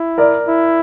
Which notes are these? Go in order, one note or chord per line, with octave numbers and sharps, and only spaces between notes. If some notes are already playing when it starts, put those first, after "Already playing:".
Already playing: E4
A#4 D5
E4